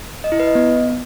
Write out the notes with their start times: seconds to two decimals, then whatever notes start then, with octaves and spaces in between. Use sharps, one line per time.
0.24 D#5
0.32 E4
0.40 B4
0.47 D#5
0.55 B3